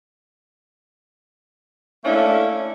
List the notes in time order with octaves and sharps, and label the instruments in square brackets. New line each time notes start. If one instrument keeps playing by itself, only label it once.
[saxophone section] A3 A#3 C#4 D4 E4